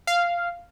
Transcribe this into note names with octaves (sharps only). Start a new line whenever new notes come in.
F5